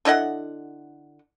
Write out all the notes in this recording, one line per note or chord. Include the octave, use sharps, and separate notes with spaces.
D3 E4 D#5 F#5